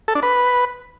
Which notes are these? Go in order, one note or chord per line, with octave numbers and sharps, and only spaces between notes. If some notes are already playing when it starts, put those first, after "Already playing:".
A4
D4
B4